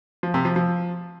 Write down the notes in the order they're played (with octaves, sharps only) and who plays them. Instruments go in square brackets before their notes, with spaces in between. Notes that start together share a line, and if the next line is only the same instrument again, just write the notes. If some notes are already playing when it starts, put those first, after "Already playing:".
[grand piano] F3
C3
F3
F3